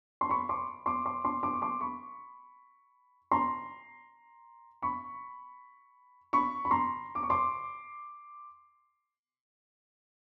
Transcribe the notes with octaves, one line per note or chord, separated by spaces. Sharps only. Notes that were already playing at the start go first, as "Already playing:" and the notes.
C6
B5 C#6
C6 D6
C6 D6
C6 D6
C6 D6
C6 D6
C#6
C6 D6
B5 C#6
A#5 C6
B5 C#6
B5 C#6
B5
A#5 C6
D6
C#6
C6 D6